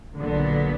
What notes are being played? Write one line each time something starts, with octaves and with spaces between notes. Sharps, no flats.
A#1 A#2 D3 F#3 B3